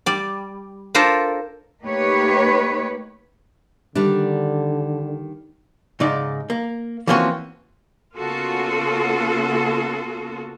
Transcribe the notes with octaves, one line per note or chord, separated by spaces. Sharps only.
G3 D5
D4 F4 A4 A#4 C5
A3 A#3 D#4 G4 B4 C#5
D3 D#3 G3 D4
G#2 C#3 D#4 D5
A#3
E3 F3 A#3 C4 C#4 F#4
C#3 A#3 B3 F4 F#4 A4